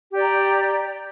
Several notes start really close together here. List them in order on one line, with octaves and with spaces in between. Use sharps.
G4 D5 A#5